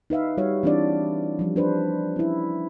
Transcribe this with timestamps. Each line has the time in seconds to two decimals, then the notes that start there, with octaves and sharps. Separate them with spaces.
0.10 D#4 B4 E5 F5
0.37 G3 F#4 C#5 F5
0.63 E3 C4 D4 E4 D5
1.39 F3 G3 C#4
1.56 D4 B4 C5
2.16 C#4 E4